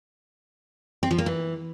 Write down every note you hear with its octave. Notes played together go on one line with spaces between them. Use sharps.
C4
F3
A#3
E3